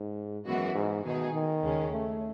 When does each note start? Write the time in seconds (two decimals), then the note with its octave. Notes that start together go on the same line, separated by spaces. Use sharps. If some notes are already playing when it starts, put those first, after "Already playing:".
Already playing: G#2
0.45 F#2 E3 G#3 B3 F#4
0.74 G#2
1.04 B2 D#3 A3 D#4 G#4
1.33 D#3
1.63 D#2 C#3 G#3 C#4
1.92 A3